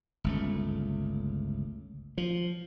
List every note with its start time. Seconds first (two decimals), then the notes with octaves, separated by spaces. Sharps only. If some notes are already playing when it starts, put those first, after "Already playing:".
0.24 G1 C#2 A3
2.18 F3